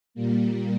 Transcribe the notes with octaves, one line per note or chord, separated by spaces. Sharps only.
A#2 G3 A#3